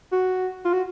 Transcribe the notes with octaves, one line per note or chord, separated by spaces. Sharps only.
F#4
F4
F#4